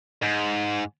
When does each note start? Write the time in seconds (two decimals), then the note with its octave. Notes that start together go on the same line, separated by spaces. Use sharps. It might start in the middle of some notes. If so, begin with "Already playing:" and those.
0.23 G#2